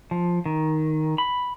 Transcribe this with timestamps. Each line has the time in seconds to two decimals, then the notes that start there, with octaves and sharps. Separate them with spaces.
0.11 F3
0.46 D#3
1.18 B5